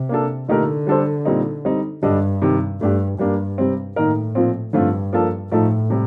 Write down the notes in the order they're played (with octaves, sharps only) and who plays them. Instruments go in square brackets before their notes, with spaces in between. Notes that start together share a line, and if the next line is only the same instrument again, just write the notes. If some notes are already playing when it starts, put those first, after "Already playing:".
Already playing: [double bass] C3
[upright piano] A#3 D4 A4
[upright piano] A#2 A3 D#4 G4 A#4 [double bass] D3
[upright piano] G3 D4 A4 C5
A#2 G3 C4 D#4
G3 C4 D#4
[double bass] G2 [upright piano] D3 G3 D4 A4 D#5
[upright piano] C3 D#3 G3
[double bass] G2 [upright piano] A3 D4 G4
[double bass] G2 [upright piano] G3 A#3 D4
[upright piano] C3 G3 C4
[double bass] A2 [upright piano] D#3 A#3 D#4 A#4
[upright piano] A#2 F3 C4
[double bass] G2 [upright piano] D3 F3 A3 C4 F4
[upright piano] F3 A#3 D4 F4 A4
[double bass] A2 [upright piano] F3 A3 D#4 A4
[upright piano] C3 G3